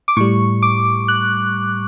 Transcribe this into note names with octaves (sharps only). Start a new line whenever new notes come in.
D6
A2 G3 C#6
D6
F#6